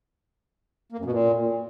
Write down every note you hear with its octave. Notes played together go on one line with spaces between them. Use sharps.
A#3
F#2
B2
A#2